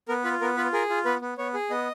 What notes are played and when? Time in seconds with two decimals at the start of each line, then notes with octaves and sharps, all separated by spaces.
0.08 B3 A#4
0.24 F4 B4
0.41 B3 A#4
0.57 F4 B4
0.73 G#4 A#4
0.90 F4
1.05 B3 B4
1.21 B3
1.38 B3 C#5
1.54 G#4
1.70 B3 D#5